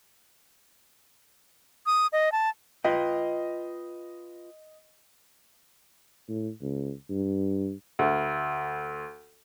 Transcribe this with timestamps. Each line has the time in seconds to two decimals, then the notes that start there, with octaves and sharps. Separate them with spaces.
1.86 D#6
2.13 D#5
2.32 A5
2.84 F4 B4 D#5 G5
6.29 A2
6.62 C#2
7.09 G2
7.99 D2